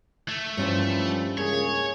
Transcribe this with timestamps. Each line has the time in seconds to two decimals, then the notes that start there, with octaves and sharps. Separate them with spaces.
0.28 A3
0.57 G2 E3 F3 G3 C#4 C5
1.37 C#2 A#3 G#4 C#5